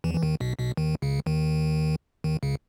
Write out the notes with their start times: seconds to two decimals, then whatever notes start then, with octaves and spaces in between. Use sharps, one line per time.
0.04 E2 E3
0.14 E3
0.23 D#2 D#3
0.40 B1 B2
0.59 B1 B2
0.77 D#2 D#3
1.02 C#2 C#3
1.26 D#2 D#3
2.24 D#2 D#3
2.43 C#2 C#3